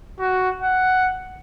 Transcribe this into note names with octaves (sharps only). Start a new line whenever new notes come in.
F#4
F#5